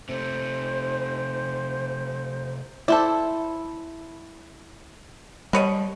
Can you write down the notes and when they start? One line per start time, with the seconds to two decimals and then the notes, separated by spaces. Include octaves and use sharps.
0.09 C3 A3 C5
2.88 E4 A4 C5 D5
5.53 B2 G3 C#5 D#5